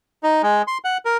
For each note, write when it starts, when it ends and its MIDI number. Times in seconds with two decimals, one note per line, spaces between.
0.23 0.42 63
0.43 0.62 56
0.67 0.78 84
0.85 0.97 78
1.05 1.17 70